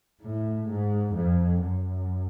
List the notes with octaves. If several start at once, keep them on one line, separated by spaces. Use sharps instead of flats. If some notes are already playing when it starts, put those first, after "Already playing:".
A2
G#2
F2
F#2